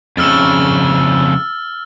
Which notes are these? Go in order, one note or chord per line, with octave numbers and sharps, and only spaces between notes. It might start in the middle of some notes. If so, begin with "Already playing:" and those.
F2 C#3 E6 F6 A6